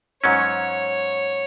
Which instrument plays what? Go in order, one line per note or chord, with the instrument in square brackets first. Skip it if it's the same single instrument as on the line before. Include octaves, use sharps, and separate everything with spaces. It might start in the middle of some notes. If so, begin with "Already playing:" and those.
[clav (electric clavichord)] G#2 F#3 C#4 [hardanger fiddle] C#5